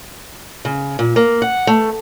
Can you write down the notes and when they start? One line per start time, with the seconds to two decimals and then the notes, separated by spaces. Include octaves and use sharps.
0.65 C#3
0.99 A#2
1.16 A#3
1.42 F#5
1.67 A3